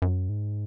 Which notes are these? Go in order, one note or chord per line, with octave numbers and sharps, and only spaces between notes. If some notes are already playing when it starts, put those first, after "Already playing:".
F#2
G#2